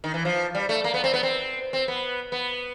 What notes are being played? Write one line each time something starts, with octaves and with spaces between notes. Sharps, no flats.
D#3
E3
F3
G3
A3
A#3
B3
C4
B3
C4
C4
B3
B3